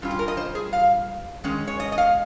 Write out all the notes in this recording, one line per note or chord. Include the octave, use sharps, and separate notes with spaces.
G2 G3 C#4 F4
G4
A#4
D#5
C5
G#4
F5
D#3 G#3 C#4
C#5
D#5
D#5
F5